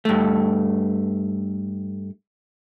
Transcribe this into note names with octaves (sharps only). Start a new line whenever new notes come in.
G2 A3